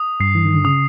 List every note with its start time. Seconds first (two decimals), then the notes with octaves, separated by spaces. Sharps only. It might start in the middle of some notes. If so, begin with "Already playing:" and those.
Already playing: D#6
0.20 G2 C7
0.35 E3
0.45 D#3
0.54 D3
0.64 C#3 D#6